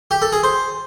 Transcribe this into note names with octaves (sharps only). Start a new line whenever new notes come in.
G4
A4
G#4
C5